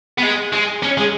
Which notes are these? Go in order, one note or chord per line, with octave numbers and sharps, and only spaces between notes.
B3
G#3
G#3
C#4
G#3